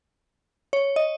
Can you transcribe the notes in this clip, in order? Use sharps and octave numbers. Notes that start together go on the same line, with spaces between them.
C#5
D#5